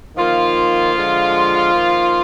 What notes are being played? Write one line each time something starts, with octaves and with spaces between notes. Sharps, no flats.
D#3 F3 A#3 F4
D3 G#3
D#3 A#3